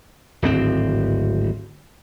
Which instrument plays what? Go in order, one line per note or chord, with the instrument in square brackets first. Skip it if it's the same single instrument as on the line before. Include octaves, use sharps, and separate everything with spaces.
[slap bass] D1 G#1 C4